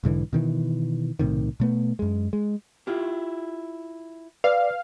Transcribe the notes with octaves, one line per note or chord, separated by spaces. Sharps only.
B1 G#2 D3 E3
B2 D#3 E3
B1 A2 C3 D#3
B2 A3 B3
F#2 G#3
G#3
E4 F4 G4
B4 D5 F5